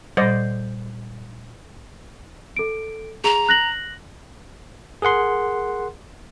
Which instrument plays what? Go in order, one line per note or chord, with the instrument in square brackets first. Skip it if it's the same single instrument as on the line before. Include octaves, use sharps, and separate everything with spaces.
[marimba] A#2 G3 [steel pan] C5 D5 D#5
[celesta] A4 D7
[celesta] G#4 [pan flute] A#5
[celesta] F#6 A#6 F#7
[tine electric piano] G#4 A#4 F#5 C6